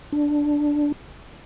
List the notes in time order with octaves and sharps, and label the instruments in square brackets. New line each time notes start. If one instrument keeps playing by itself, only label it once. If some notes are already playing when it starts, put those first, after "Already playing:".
[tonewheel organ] D4